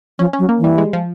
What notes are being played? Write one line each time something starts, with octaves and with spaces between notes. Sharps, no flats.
F3 C#4
C#4
F#3
A#3
E3
G3
G#3
F3